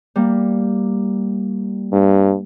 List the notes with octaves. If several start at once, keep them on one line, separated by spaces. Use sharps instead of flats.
G3 A#3
G2